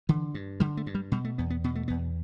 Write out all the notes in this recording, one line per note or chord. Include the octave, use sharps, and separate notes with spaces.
D3 E3
G2
D3 G3
A3
G2
G3
B2 G3
A3
E2 B3
B3
B2 B3
A3
E2 B3